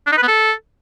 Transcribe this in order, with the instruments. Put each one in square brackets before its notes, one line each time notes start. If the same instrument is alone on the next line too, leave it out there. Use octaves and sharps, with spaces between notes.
[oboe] D4
D#4
B4
B3
A4